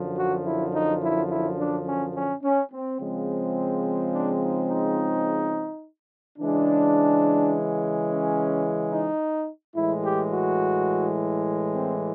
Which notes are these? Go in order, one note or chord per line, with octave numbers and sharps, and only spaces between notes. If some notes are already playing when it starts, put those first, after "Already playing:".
Already playing: F#2 D3 F3
F#4
E4
D#4
E4
E4
D4
C#4
C#4
C#4
C4
C#3 F3 G#3 C4
D4
D#4
D#4
C#3 E3 G#3 D4
C#4
D#4
A2 E3 G#3 E4
G4
F#4
C4